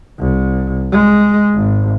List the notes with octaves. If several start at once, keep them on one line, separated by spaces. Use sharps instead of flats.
C2
G#3
G#1